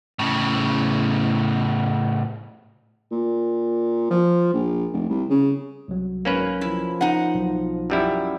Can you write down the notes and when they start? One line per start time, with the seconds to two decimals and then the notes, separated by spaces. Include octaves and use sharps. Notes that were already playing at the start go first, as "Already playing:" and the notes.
0.19 A2 C#3
3.12 A#2
4.11 F3
4.54 A#1
4.93 F1
5.09 C2
5.30 C#3
5.88 C2 F#3
6.25 G#1 A#3 C#4 B4
6.61 F3 E4
7.01 D#4 F#5
7.35 B1
7.90 F#2 G3 E4